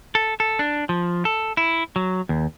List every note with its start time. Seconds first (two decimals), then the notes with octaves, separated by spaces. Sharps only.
0.15 A4
0.40 A4
0.59 D4
0.89 F3
1.25 A4
1.57 E4
1.96 F#3
2.29 D#2